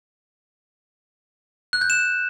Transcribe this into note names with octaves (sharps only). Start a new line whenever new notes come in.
F#6
G6
E7